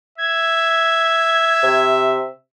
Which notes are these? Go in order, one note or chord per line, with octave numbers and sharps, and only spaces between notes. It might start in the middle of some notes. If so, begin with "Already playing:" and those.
E5 G#6
C3